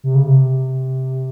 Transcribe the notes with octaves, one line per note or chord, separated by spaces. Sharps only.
C3
C#3
C3